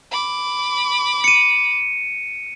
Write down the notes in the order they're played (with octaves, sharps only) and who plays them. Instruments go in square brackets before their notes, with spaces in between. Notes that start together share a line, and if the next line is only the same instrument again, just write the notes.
[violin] B5 D6
[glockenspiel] C#7 D#7